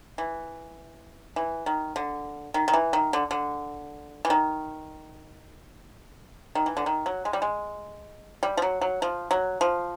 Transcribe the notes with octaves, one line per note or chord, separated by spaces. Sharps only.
E3
E3
D#3
D3
D#3
D#3
E3
D#3
D3
D3
E3
D#3
D#3
E3
D3
D#3
F#3
G#3
G3
G#3
G3
F3
F#3
F#3
F3
F#3
F3